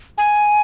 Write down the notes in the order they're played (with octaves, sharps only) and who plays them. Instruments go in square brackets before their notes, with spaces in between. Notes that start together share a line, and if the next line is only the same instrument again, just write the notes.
[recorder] G#5